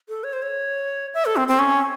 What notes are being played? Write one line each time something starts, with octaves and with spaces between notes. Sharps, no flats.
A4
C#5
C5
C#5
E5
A4
C4
C4
C#4